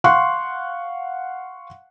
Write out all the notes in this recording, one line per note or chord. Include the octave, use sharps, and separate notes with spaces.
F5 F#5 C6 C#6 F#6